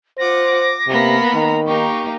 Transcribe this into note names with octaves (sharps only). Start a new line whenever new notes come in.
F4 C5 F#5 D6 A#6
D6
C3 A#3 B3 B5
D#3 A#5
A#3 D#4 G4 C#6